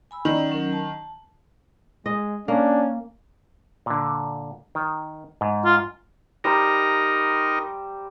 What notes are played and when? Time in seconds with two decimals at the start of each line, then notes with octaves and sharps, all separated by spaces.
0.11 G#5 B5 E6
0.25 D#3 C#4 D5 D#5
0.49 F#3 C#4 A#4
0.72 A5
2.06 G#3 D#5
2.48 A#3 C#4 D4
3.86 A#2 D3
4.75 D#3
5.41 G#2
5.65 F4
6.44 G3 D#4 A#4 C5 A#5